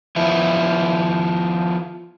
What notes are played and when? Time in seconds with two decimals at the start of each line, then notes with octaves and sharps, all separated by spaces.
0.16 F3 B3 E4